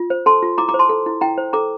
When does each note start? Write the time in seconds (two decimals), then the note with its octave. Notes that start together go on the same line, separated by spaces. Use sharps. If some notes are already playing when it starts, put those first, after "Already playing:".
Already playing: F4
0.10 C5
0.26 A4 A5 C6
0.43 F4
0.58 E4 A#5 D6
0.69 A#5 D6
0.74 C5
0.79 A5 C6
0.89 A4
1.06 E4
1.21 E4 G5 A#5
1.38 C5
1.53 A4 A#5 D6